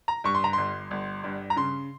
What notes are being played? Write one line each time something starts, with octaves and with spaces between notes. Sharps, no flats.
A#5
G2 C#6
C6
A#5
G1 C6
G1
G2
A#5
C#3 C6